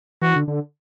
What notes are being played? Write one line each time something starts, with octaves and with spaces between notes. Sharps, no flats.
E3 F#4
D3
D3